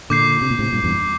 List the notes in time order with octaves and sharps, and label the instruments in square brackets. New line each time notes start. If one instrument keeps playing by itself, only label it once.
[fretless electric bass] A#2 D3 [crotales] D6 G6 C7
[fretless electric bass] C3
A#2
A2 C3
G2 A#2
E2 G2